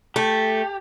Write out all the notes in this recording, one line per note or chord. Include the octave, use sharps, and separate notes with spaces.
A3 G4